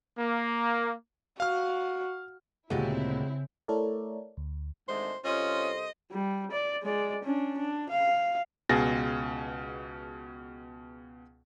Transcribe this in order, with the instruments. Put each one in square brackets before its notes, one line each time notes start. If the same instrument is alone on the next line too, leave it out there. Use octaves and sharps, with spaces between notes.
[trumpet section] A#3
[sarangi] F#4 [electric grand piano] F5 F6
[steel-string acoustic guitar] D2 A#2 [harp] C#3 [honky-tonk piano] G#3 F#4 G4 [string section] C4 E4
[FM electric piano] A3 E4 A4 A#4 C#5 D5
D2
[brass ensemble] G#1 D3 [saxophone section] G#2 G#3 A3 [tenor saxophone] C5
[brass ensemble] C2 A4 C5 [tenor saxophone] C#4 [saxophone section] F4 [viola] D#5
[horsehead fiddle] G3
D5
G#3 D5
C#4 D4
D4
F5
[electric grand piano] C#2 B2 G#4 A6 A#6